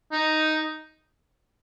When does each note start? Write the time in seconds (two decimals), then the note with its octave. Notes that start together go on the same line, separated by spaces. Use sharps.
0.12 D#4